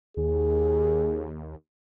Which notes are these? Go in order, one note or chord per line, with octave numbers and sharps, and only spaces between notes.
D#2 G#4